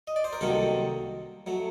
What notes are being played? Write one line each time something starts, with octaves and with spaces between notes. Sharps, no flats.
D#5
D5
C5
A#4
C2 C3 D#3 F#3 A#3 A4
F#3 A3